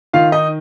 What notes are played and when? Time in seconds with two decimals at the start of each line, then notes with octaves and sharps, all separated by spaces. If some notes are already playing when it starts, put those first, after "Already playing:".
0.13 D#3 F4 F5
0.32 D#4 D#5